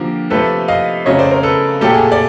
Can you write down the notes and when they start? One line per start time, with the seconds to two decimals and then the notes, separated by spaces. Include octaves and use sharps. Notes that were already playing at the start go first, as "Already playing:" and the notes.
Already playing: D3 F3 A#3 G4
0.30 C3 F3 A3 A4 B4
0.68 D#5 F5
1.06 C#3 F#3 A3 C#5 D#5
1.19 C5 D5
1.31 A#4 C5
1.43 A4 B4
1.81 A#2 F#3 A3 G4 A4
1.94 G#4
2.12 D5